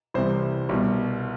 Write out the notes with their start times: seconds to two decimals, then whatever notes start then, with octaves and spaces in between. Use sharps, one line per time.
0.14 C2 C3 E3 C5
0.69 C2 B2